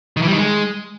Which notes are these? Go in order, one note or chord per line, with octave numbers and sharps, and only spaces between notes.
D#3
E3
G3
D#3
G#3